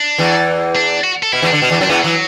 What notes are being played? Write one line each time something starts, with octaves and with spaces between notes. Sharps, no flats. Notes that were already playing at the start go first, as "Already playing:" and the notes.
Already playing: D4
E2 E3
D4
F#4
A4
B2 E4
E2 E3
D4
D3
B2
E2 E3
F#2 F#3
D4
E2 E3 B3
E3 F#3